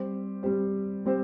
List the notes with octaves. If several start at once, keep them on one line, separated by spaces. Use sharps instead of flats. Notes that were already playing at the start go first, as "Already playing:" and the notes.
Already playing: G3 C4 G4 C5
G3 C4 G4 C5
G3 C4 G4 C5